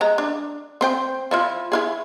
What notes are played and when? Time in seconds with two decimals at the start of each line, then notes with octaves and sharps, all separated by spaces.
0.01 G#3 A#5
0.18 D4
0.81 C4 C5 G5
1.31 F3 E4 F4
1.72 E4 F4 G#4